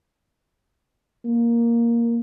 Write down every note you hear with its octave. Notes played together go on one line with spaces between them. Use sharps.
A#3